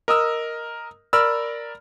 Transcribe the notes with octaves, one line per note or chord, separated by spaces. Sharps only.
A#4 D#5 D#6 E6
A#4 D5 B5 E6 F6